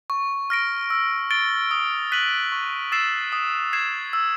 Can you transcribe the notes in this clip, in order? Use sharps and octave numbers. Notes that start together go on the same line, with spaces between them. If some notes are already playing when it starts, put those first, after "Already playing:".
C#6
F6 A#6 D7
E6
A6 D7 G7
D#6
F#6 B6 D#7 F#7
C#6
E6 A6 C7 E7
D#6
G#6 C7 E7
E6